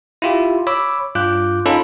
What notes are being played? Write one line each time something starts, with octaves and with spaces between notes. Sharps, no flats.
E4 F4 G4
C#5 B5 D6 E6
G2 F4 D6 F#6 G6
C#4 D#4 F4 A4 B5